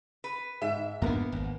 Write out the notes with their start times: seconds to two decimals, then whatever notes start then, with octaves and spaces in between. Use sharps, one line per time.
0.24 B4
0.62 G#2 E5
1.02 F2 G#2 A#3 B3 D4
1.32 G#1